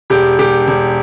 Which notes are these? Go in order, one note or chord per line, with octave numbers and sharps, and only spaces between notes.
E1 G4
E1 G4
E1